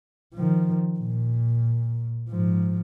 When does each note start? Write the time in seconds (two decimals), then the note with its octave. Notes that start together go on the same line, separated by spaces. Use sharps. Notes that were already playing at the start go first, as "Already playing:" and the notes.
0.34 D#3 F3
0.99 A#2
2.30 G#2 F3